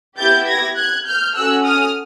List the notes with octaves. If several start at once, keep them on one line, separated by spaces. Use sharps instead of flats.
B3 E4 G4 G6 A6
G#6 A#6
F#6 G#6
F6 G6
C#4 F#4 A4 E6 F#6
D#6 F6